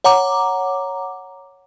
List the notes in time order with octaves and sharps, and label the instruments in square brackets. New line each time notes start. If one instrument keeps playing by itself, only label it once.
[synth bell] C#5 F#5 A#5 D6